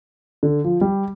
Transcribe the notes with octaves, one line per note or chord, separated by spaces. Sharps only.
D3
F3
G3